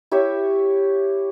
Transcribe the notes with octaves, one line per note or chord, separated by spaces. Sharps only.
E4 G4 C#5 E5